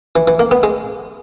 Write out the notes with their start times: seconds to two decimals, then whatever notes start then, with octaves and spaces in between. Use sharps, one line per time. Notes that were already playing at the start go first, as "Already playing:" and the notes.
0.16 E3
0.27 E3
0.39 A#3
0.51 B3
0.63 G#3